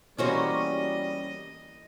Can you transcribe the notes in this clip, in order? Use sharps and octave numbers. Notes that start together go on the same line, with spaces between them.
E3 G3 A#3 B3 C#4 F#4 C5 D#5